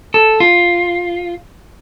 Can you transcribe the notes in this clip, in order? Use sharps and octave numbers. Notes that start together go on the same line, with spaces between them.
A4
F4